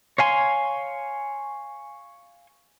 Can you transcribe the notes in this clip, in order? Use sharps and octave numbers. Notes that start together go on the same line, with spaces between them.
C#5 F5 G#5 C6